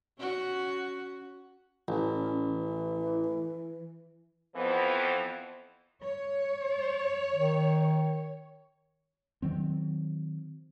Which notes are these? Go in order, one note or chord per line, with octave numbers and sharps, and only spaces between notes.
C#4 F#4
A1 C#4
E3
F2 E3 F3 B3
C#5
D#3
D#3 F#3 C4